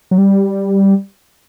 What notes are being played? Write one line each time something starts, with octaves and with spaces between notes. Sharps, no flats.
F#3
G3